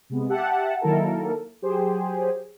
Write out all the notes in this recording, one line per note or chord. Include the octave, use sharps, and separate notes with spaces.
C3 G#3 B3
G4 E5 F#5 A5
D#3 F#3 A#3 E4 A4 A#4
F#3 G4 G#4 C5